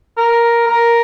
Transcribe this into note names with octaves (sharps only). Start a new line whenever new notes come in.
A#4
A#4